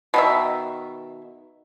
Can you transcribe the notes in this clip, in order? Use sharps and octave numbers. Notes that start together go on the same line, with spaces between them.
B2 D#3 E5